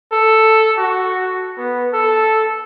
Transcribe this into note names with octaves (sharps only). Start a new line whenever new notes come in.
A4
F#4
B3
A4